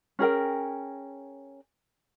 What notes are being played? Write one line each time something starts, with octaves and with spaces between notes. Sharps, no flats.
C#4 G#4 A#4 G5